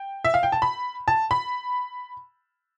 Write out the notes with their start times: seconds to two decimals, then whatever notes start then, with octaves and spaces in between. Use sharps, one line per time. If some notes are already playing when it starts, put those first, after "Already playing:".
Already playing: G5
0.25 E5
0.34 F5
0.43 G5
0.52 A5
0.62 B5
1.08 A5
1.31 B5